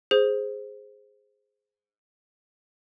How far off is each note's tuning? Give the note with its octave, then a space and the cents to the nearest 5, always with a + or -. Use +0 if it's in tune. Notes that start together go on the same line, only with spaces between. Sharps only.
G#4 +0 C5 +0